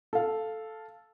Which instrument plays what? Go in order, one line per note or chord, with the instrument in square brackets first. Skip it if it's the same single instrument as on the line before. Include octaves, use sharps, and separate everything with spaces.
[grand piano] A4 F5